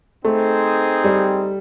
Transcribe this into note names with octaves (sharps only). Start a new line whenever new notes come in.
A3 C4 D#4 G#4 C5
G3